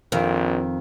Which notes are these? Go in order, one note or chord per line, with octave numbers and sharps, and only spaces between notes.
A#1 F2 D#3